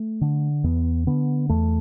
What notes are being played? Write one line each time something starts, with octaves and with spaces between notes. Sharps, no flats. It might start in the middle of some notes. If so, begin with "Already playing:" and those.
Already playing: A3
D3
E2 B3
D3 B3
E2 A3